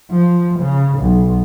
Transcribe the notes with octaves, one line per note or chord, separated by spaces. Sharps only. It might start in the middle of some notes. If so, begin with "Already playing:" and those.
F3
C#3
B1